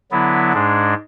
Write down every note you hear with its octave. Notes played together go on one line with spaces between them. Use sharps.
D3 F#3 B3 E4
G#2 G#3 D4